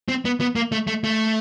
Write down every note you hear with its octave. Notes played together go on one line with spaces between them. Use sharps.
C4
B3
B3
A#3
A3
A3
A3